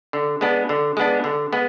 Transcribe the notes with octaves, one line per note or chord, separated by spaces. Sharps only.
D3
G#3 B3 D4
D3
G#3 B3 D4
D3
G#3 B3